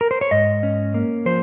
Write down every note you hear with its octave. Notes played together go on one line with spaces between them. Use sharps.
A#4
C5
C#5
G#2 D#5
C#4
A#3
F3 C5